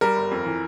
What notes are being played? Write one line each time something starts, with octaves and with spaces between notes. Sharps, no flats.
G3 A#4
G1
F2
E3